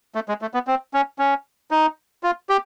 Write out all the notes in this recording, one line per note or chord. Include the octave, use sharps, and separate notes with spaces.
A3
G#3
A3
B3
C4
C#4
C#4
D#4
F4
G4